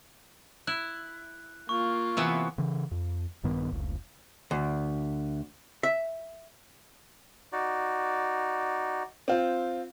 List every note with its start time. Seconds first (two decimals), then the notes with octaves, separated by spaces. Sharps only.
0.67 E4 F#6
1.69 A#3 F4 C#6
2.17 C3 E3 B3
2.58 C#3 E3
2.91 F2
3.43 A#1 G2 D#3 B3
3.71 F1 C#2
4.51 D2
5.83 E5
7.52 D#4 F#4 D5
9.28 C4 F4